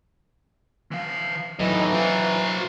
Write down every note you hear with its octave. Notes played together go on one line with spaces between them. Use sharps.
E3 F5
D#2 A2 E3 F#3 D#4 D#5
F#4 A#4 C5 F5